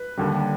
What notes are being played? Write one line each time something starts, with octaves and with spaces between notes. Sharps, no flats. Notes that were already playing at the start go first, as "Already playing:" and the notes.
Already playing: B4
D#2 D3 G3